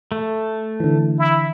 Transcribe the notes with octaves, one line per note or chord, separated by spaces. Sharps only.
A3
D3 E3
E4